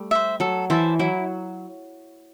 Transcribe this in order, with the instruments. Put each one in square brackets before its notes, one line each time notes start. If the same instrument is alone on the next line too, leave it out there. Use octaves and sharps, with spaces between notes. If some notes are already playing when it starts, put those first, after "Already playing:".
Already playing: [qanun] G3 A3
[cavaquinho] C5 E5
[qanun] F#3 [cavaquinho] A4
[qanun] E3 [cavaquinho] C5 E5 A5
[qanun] F#3 [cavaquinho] E4